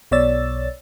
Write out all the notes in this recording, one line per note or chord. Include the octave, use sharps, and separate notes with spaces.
B1 B2 C#5 D5 E6 A6